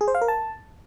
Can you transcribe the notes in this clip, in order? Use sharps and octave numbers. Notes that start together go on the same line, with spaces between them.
G#4
C5
F5
A#4
A5